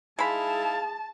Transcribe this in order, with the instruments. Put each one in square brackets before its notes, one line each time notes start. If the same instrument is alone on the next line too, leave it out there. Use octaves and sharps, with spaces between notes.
[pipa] G#3 B5 [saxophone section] D#4 E4 F5 [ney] G#4 [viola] A5